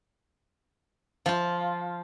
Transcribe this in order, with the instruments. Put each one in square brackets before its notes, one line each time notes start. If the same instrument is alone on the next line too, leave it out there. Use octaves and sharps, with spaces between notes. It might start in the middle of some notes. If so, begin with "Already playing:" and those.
[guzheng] F3 F4